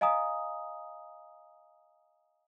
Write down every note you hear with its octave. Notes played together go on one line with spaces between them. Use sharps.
D#5 F5 G#5 A#5 D#6